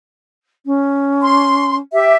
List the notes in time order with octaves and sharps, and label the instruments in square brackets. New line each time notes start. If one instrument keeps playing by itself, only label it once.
[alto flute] C#4
[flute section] C6
G4 E5